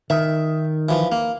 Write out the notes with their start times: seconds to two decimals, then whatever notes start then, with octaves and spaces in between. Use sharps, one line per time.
0.10 D#3 E5
0.89 E3 F3
1.12 A#3